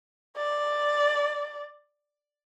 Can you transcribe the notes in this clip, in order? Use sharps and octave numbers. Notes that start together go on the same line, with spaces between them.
D5